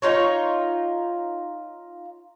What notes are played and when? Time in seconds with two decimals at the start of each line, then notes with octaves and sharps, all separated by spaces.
0.02 D#4 F4 C#5